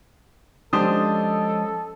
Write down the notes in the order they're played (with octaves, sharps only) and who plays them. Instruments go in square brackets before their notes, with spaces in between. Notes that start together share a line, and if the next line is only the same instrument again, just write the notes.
[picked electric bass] F3 G#3 C#4 [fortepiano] D4 G4 C5 [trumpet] A4 [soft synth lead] D#6